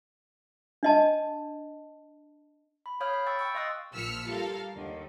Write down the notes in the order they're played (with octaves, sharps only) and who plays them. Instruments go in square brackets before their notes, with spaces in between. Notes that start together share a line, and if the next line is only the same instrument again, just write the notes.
[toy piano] D4 D#5 A5
[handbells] B5
C#5 F5 B5 D#6 F6 G6
B5
G5 C#6 E6 G6 A6
G5 C#6 E6
D#5 F5 C6 D#6 F#6 A6
[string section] A#1 F3 E6 F6 B6 C#7
G3 F4 A4 A#4 F5
D#2 D3